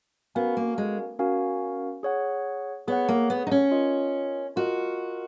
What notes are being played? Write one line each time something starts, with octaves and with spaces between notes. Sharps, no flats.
B3 C#4 F#4 A#4 F5 G#5
A#3
G#3
C#4 F#4 A#4 F5 G#5
G#4 C#5 F#5
B3 G#4 C#5 F#5
A#3
B3
D#4
C#4
F4 A#4 D#5
F4 F#4 A#4 D#5